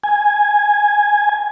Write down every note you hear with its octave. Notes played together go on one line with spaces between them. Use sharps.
G#5